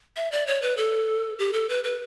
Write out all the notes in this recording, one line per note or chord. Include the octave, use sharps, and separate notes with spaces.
E5
D5
C#5
B4
A4
G4
A4
B4
B4